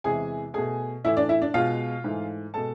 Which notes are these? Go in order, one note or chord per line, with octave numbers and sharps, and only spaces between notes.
E2 C3 E3 G#3 G#4 G#5
B2 A3 G#4 G#5
A2 E3 A3 E4 E5
D4 D5
E4 E5
D4 D5
B2 G#3 F4 F5
G#2 E3 A3
B2 G#3 A4 A5